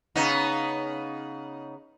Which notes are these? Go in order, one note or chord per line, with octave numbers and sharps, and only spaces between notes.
C#3 B3 D#4